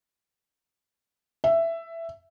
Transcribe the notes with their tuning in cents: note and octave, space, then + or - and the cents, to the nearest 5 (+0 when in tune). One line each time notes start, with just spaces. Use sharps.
E5 +10